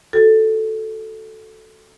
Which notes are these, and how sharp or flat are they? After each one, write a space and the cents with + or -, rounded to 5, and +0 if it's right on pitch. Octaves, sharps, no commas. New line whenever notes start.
F#4 +0 A4 +0